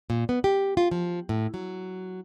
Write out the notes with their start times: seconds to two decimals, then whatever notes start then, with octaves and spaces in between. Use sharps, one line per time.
0.10 A#2
0.29 B3
0.44 G4
0.77 F4
0.91 F3
1.29 A2
1.54 F#3